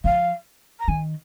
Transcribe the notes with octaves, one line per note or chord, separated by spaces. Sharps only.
F3 F5
A#5
D#3 G#5